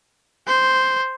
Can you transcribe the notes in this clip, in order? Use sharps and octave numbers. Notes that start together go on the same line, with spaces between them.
C5